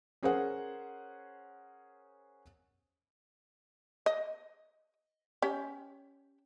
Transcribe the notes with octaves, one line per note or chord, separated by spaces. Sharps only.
C#4 G#4 A#4 C5 C#5 F#5
D#5
C#4 G4